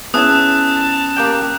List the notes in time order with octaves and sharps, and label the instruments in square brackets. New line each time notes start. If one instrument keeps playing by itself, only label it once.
[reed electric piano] B3 C#4 [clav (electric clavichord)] E4 G#4 [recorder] A5 [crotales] D#6 F#6
[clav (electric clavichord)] A#3 G4 G5